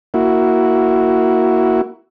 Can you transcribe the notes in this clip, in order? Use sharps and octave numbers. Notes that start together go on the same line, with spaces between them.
A#3 E4 F#4